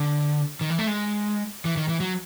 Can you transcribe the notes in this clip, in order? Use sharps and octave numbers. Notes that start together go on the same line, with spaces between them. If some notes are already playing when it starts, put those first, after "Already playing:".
Already playing: D3
D#3
E3
A3
G#3
E3
D#3
E3
F#3